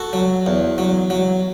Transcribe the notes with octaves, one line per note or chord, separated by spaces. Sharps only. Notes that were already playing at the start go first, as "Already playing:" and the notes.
Already playing: F#4 A4
F#3
E2
F#3
F#3